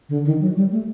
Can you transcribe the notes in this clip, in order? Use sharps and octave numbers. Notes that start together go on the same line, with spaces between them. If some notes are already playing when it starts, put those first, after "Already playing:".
D3
D#3
F#3
G3
A3